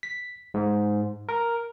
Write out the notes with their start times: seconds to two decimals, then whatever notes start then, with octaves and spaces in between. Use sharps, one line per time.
0.03 B6
0.54 G#2
1.29 A#4